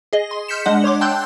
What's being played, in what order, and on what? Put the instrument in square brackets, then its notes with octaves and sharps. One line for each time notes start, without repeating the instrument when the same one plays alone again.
[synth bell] G#4 D#5
C6
F6 G6 B6 C#7 E7
G#3 D4 D#5 F#5
C#5 C6 D6
G5 A5 C6 E6 F#6 G6